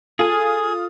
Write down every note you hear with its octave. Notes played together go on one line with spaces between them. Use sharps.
F4 G#4 A4 G#5 D#6